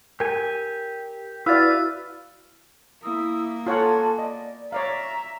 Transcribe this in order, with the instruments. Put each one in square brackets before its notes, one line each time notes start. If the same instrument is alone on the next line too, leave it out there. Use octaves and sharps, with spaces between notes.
[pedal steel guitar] G4 G#5 [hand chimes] A#4
[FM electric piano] E4 F#4 D5 [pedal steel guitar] B4 [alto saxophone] F5 [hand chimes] E6 A6
[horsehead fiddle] A#3 [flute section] E4 D#6 E6
[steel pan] F4 C#5 F#5 [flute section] A4 G#5 A5
[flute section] D5 [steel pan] D#5
[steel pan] C#5 D5 F5 [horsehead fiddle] E5 [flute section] A#5